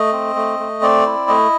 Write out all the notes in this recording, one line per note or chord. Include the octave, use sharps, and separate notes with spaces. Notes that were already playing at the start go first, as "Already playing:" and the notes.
Already playing: A3 D#5
C4
A3
A3
C4 D5
E4
A3 D#5